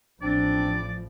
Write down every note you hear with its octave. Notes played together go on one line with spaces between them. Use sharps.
A1 F3 C4 D4 D5